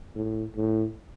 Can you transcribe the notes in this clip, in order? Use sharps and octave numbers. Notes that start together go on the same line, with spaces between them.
A2
A2